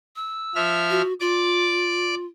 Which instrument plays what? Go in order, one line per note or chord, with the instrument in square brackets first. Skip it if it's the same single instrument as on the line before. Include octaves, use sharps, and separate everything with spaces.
[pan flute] E6
[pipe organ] F3 E5 F6
[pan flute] F#4
[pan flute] F4 [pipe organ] D5 D6